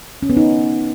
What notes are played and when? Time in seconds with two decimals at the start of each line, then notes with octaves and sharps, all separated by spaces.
0.23 C#4
0.30 B3
0.37 D#4